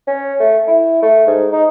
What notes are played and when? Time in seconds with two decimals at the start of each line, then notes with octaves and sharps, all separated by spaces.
0.07 C#4
0.40 A3
0.68 E4
1.02 A3
1.27 G#2
1.52 D#4